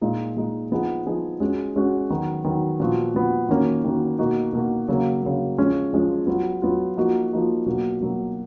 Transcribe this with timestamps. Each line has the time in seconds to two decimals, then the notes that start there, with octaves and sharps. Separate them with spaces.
0.01 A#2 G#3 D#4
0.36 A#2 G#3 D#4
0.71 F3 B3 D#4 G#4
1.06 F3 B3 D#4 G#4
1.40 G#3 C#4 F#4
1.76 G#3 C#4 F#4
2.10 D#3 F#3 B3
2.44 D#3 F#3 B3
2.80 A#2 F3 B3 F#4
3.14 A#2 F3 B3 F#4
3.49 D#3 A#3 C#4 F#4
3.84 D#3 A#3 C#4 F#4
4.19 B2 A#3 D#4 F#4
4.53 B2 A#3 D#4 F#4
4.88 C#3 F#3 A#3
5.23 C#3 F#3 A#3
5.58 F3 G#3 C#4
5.93 F3 G#3 C#4
6.27 F#3 B3 F4
6.62 F#3 B3 F4
6.97 F3 A#3 D#4 F#4
7.32 F3 A#3 D#4 F#4
7.66 B2 F#3 A#3
8.00 B2 F#3 A#3